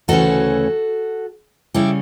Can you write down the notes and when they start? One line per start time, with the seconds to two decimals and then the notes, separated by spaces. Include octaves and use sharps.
0.08 D2 C#3 E3 A3 C#4 F#4 A4
1.74 C#3 G3 C#4 E4 G4